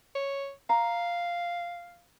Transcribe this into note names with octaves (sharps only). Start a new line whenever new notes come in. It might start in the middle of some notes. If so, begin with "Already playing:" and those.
C#5
F5 A#5